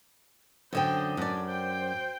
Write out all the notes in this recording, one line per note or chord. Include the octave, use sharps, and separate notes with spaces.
F#2 D3 C5 D#5 G5
F#2 D4 D5
C5 G5